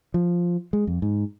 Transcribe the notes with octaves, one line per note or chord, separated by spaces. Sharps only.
F3
G#3
F2
G#2